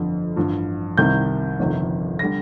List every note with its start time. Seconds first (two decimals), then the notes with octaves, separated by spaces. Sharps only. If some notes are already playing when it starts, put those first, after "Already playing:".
Already playing: G1 F2 D3
0.36 A1 G2 F3
0.97 C2 C3 D#3 G3 G6
1.59 G1 F2 C3 D#3
2.19 D3 G3 A#6